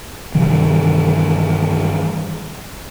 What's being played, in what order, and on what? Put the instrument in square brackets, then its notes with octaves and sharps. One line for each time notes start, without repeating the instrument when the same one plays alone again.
[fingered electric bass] G2 C3 D#3 E3